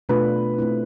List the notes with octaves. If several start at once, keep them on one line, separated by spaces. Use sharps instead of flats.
B2 A3 D4 F4 B4
A3 C4 E4